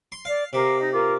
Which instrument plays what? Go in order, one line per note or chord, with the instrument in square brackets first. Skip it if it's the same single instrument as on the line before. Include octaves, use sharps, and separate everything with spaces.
[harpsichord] C6
[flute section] D5 [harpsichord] F5
[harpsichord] C3 [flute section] A#4 F5 D6
[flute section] D#4
F4 A#4 D6